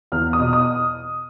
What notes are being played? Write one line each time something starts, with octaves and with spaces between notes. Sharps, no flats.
E2 F6
D#6
B2
D#6